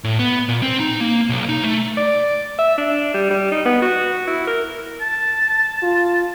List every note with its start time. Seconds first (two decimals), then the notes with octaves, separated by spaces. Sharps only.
0.04 A2
0.19 B3
0.49 A#2
0.63 C4
0.80 D#4
1.01 A#3
1.29 B1
1.49 D#4
1.64 A3
1.97 D5
2.59 E5
2.78 D4
3.14 G3
3.30 G3
3.52 D#4
3.65 B3
3.82 F#4
4.27 E4
4.47 A#4
5.01 A5
5.82 F4